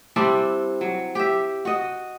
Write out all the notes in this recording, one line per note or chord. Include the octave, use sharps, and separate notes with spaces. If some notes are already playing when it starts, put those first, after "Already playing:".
G3 C4 D4 E4
F#3
G4 E5
F#4 D#5